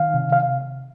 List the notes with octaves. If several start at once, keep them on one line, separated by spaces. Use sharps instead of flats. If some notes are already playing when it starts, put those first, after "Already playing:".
Already playing: D#3 F5
C3
F5